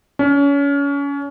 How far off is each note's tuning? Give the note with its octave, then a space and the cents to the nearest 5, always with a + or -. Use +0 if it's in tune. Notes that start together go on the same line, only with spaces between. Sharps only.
C#4 +30